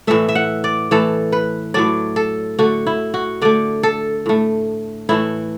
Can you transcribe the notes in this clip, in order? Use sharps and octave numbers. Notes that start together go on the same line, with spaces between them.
A2 E3 A3 E5
E5
F#5
D5
A2 E3 A3 A4
B4
A2 F#3 A3 D5
A4
D3 A3 F#4
E4
F#4
D3 A3 D5
A4
A2 A3
A2 E3 A3 E4